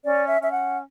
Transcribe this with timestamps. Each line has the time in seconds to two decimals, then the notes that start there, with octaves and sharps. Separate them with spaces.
0.03 C#4 D5
0.28 E5
0.40 C#4 E5
0.52 F#5